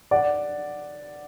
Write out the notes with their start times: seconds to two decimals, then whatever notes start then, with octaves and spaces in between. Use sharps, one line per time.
0.11 D5 F#5